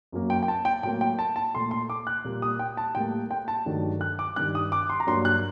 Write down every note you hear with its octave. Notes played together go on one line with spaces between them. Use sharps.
F#2 F#3 A#3
G5
G5
A5
G5
A2 F#3 A#3 G5
G5
A5
A5
A#2 A3 C6
C6
D6
F#6
A#2 G3 A#3
D#6
G5
A5
A2 G3 A#3 G5
G5
A5
G2 D#3 F#3 A3
F#6
D6
G2 D#3 G3 F#6
D#6
D6
C6
A#5
G2 F#3 A#3 C6
F#6